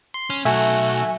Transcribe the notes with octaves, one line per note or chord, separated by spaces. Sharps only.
C6
C#4
B1 A3 F#4 E5 G#5